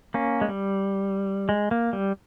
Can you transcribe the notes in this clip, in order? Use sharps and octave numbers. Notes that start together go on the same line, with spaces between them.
A#3 C#4
G#3
G3
G#3
A#3
G3